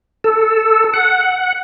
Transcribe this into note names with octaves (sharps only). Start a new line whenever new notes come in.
A4
F#5